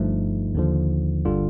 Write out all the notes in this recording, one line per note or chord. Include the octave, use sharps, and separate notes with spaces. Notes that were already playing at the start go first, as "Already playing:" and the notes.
Already playing: G1 G2 F3 A3 D#4
D#2 D3 F3
G1 D3 G3 F4